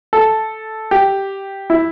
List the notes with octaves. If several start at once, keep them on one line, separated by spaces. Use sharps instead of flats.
A4
G4
E4